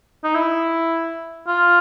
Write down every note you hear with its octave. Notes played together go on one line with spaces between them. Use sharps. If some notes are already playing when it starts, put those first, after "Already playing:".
D#4
E4
F4